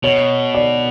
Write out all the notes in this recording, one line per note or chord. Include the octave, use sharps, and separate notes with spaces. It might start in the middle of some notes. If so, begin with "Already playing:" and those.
B2 C#5
D5